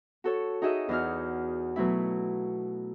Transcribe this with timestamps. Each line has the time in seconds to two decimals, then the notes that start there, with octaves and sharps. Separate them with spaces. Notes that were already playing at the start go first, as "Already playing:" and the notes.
0.24 F#4 A4 C#5
0.62 D#4 F#4 G#4 D#5 E5
0.89 E2 D#4 F#4 F6
1.76 B2 F#3 A3 E4